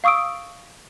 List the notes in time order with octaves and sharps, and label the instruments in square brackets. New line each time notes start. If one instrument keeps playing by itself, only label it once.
[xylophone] F5 C#6 D#6 E6 D7